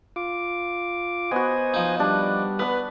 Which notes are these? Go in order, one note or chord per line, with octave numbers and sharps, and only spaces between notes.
F4 D6
B3 F#4 C5 D#5 G#5
F3 D#4
G3 D4
B3 B4 F#5